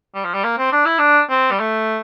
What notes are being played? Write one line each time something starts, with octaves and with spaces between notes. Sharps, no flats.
G3
F3
G3
A#3
C4
D4
E4
D4
C4
G3
A3